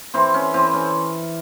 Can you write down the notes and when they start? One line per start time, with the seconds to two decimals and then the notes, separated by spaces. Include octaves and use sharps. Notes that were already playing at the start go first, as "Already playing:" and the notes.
0.14 E3 C4
0.34 C#4
0.54 E3 C4
0.73 C#4